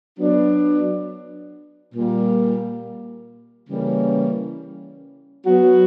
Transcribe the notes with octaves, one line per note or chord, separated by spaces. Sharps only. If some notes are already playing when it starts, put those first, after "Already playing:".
F#3 B3 D4
A#2 G3 A#3
C#3 E3 G3 A#3 C#4
F#3 B3 F#4